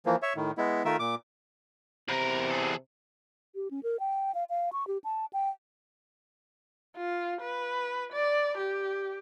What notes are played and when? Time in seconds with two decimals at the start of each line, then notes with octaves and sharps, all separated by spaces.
0.06 E3 F3 A#3
0.22 C#5 E5
0.36 A2 D#3
0.58 G#3 B3 E4
0.85 D#3 A3 F4 A#4 E5
0.99 A#2 D6
2.09 E2 C3 A#4 B4 A#5
2.50 G#4 A4
3.55 G4
3.71 C#4
3.83 A#4
4.00 G5
4.35 F5
4.50 F5
4.73 C#6
4.87 G4
5.04 A5
5.33 G5
6.96 F4
7.41 B4
8.12 D5
8.58 G4